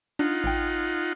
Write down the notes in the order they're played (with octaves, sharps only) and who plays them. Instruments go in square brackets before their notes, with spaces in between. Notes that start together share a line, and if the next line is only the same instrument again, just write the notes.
[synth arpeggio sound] D4 [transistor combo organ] D#4 F4 F#5
[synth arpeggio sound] A1 G5